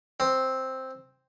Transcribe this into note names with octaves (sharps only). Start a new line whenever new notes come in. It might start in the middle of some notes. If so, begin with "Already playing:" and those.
C4